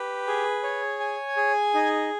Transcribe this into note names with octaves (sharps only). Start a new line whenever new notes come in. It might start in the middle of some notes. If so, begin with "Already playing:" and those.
Already playing: G4 B4
G#4
C#5
G#5
G#4
D#4